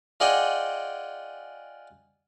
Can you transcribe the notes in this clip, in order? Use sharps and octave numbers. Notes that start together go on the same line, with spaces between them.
F4 G#4 D5 D#5 F#5 G5